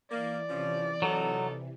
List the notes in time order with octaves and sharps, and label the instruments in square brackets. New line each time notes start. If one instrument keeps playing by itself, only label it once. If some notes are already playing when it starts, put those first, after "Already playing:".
[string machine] E3 [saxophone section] A#3 [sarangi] D5
[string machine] C3 E3 [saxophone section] F3 C#4
[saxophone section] A#2 D#4 A4 [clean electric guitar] F#3